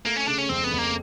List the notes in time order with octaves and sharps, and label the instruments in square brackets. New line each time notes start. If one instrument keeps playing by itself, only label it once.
[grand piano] A3 [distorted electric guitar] A#3
[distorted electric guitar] C#4
[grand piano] C#3 [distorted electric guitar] D4
[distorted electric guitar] C#4
[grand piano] F2 [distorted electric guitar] C4
[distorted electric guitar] B3
[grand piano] F2
[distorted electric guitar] A#3